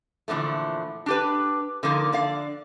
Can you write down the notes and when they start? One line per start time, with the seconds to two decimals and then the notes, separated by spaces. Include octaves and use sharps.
0.28 A#2 D3 E3 F3 A3
1.06 D4 G4 B4
1.83 D3 F3 A#3 D#4
2.12 D3 D5 F5